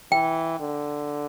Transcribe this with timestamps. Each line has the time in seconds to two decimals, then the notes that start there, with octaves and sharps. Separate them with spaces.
0.12 E3 G5
0.60 D3